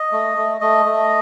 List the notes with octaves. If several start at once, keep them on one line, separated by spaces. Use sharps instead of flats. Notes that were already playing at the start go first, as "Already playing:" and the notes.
Already playing: D#5
A3
A3
A3 D#5
A3